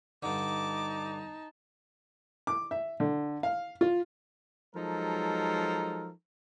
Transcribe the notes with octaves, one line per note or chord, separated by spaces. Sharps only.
G2 D3 D#4 A5 D6
D6
E5
D3
F5
F4
F3 F#3 G#3 D#4 A4 A#4